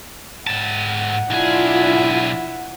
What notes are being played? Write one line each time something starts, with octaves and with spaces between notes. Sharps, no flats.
G#2 F#5 A5
B1 D4 E4 F4 G#4